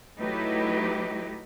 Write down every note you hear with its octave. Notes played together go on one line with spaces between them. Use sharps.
F#3 A3 D#4 E4 G4 B4